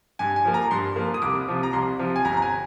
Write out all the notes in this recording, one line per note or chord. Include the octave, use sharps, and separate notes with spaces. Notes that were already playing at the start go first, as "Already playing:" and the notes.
G2 G#5
G#5
F3 A#3
A#5
G2 C6
F3 A#3
D#6
C2 D6
C3 F3
A#5
C2 C6
C3 F3
G#5
G1 A#5
A#5
G#5